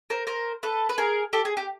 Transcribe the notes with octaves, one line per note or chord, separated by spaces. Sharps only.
A#4 C5
A#4 C5
A4 B4
B4
G#4 A#4
G4 A4
G#4
G4